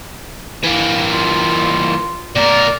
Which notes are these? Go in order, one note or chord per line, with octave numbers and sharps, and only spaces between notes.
E3 A#3
F4
B2 A#4 D5